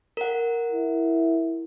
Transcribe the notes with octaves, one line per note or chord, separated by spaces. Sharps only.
A#4 F#5
E4